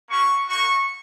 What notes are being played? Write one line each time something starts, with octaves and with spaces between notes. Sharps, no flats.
A#3 C#4 F#4 C#6
A#3 D#4 F#4 C#6